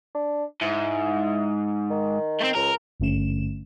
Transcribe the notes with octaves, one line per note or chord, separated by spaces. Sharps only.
D4
G#2 E4
D#3
A3 C4
C#2 A#4
G#1 G2 D3 A3 C#4 E7